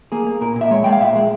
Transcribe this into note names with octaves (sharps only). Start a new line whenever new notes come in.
A#3 G#4
A#3
A#2 A#4
A#2
E5
G#3 C#5
G#3 G5
F5
A#2 E5
G#3